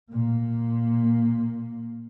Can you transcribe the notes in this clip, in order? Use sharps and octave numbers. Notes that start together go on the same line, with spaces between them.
A#2 A#3